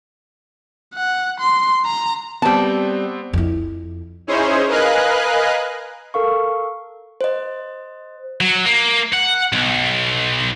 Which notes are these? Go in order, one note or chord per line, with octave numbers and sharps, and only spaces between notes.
F#5
C6
A#5
G3 B3 C4 A5
F2 E4
C#4 D#4 E4 G#4 C5 C#5
A#4 B4 D#5 F5 G#5 F#6
A4 A#4 F5 C#6
C5 D#5
F#3
A#3
F#5
B1